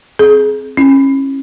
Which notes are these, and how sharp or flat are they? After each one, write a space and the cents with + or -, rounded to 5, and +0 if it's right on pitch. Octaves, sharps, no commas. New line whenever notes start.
C4 +0 G#4 +25
C#4 -30 E4 +0